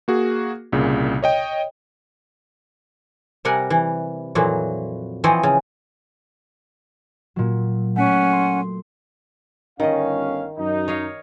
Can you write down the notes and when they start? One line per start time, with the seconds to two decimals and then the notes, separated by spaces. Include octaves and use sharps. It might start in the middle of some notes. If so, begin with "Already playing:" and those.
0.08 A#3 F#4 G#4
0.72 C2 A#2 C#3
1.23 C#5 D#5 G5
3.45 C3 G3 A#4 F#5 G#5
3.70 E3
4.35 F2 A#2 E3 F#3
5.24 E3 F3 C4 C#5 D#5
5.43 C#3
7.36 A#2 F#3
7.96 A3 C#4 F#5 G#5 B6 D7
8.33 C6
9.80 G1 D#3 C#4 D#5 F5
10.58 F#2 D#4
10.88 C#5 D#5 F5